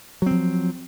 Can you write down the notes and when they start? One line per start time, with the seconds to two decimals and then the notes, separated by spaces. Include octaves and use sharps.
0.22 F#3
0.26 C4
0.31 F3